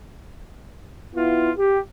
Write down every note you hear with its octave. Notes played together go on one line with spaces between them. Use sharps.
B3 E4 F4
G4